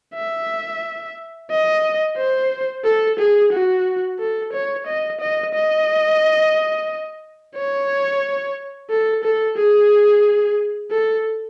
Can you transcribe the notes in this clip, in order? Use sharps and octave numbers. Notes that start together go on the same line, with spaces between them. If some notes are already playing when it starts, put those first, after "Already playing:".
E5
D#5
C5
A4
G#4
F#4
A4
C#5
D#5
D#5
D#5
C#5
A4
A4
G#4
A4